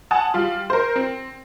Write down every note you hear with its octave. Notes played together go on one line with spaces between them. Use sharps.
F#5 G#5 A5 D#6
G3 F4
A#4 C5
C4